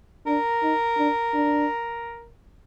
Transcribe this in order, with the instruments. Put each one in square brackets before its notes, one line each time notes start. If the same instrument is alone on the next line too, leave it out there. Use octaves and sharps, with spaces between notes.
[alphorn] D4 [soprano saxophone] A#4
[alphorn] D#4
D4
D4